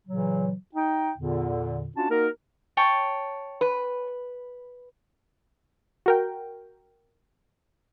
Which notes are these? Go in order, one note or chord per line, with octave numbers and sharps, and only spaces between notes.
A#2 C#3 E3 F#3
D#4 G5
E2 A#2 D3
C#4 D4 F4 F#4 A5
A#3 D#4 F#4 A#4
C#5 G5 A5
B4
F#4 A#4 G5